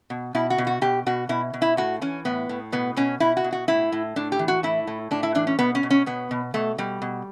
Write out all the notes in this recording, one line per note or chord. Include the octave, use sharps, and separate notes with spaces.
B2
B2 E4
F#4
B2
F#4
B2 G4
B2 F#4
B2 E4
B2
E4
A2 F#4
E3 C#4
A2 B3
A2
B2 B3
B2 C#4
B2 E4
F#4
B2
F#4
A2 E4
A2
A2 D4
G4
E3
F#4
A2 E4
A2
A2 D4
E4
E3 D4
C#4
B2 B3
C#4
B2
C#4
B2 B3
B2
B2 A3
B2 G3
B2